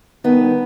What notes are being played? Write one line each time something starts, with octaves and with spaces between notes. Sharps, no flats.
G2 D#3 B3